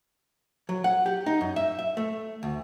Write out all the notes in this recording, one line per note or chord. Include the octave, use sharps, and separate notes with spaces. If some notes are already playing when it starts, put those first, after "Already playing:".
F#3
F#5
G4
D#4
F#2
E5
E5
A3
D2